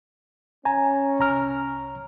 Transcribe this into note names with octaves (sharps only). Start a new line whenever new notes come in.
C#4 G#5 A#5
C2 A#5 F6